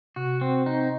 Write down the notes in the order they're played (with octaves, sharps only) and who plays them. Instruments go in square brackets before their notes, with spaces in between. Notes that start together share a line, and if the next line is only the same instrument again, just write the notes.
[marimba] C3 [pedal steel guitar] F#4
[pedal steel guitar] C4
D#4